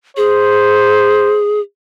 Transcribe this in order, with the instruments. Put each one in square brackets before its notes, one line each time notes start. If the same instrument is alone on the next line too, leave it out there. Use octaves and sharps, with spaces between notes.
[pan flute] G#4 [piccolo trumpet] C5